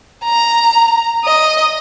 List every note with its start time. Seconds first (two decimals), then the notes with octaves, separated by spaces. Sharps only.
0.24 A#5
1.25 D#5